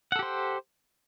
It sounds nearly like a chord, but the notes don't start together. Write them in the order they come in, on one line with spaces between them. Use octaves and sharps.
F#5 A4 G4 C5